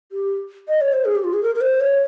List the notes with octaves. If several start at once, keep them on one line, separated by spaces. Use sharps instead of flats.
G4
D#5
C#5
C5
G#4
G4
F4
G#4
A#4
A#4
C5
C#5